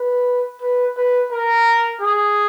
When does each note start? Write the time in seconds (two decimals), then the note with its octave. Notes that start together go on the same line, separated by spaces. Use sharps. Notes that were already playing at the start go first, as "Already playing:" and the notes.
Already playing: B4
0.61 B4
0.96 B4
1.31 A#4
2.01 G#4